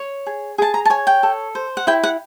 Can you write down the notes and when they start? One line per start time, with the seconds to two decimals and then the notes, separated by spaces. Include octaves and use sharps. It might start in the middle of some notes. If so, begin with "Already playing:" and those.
Already playing: C#5
0.26 G#4
0.58 G#4 A5
0.74 A#5
0.85 A5
0.90 C#5 G#5
1.07 G5
1.23 A4
1.55 C5
1.77 F#5
1.87 E4 G5
2.03 F#5